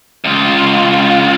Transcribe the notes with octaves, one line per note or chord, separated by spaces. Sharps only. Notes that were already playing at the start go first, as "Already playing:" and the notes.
C#2 F4